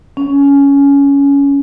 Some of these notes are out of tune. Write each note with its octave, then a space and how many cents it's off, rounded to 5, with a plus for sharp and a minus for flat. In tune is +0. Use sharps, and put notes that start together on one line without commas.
C#4 +15